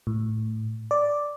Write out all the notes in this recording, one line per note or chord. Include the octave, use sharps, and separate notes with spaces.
A2
D5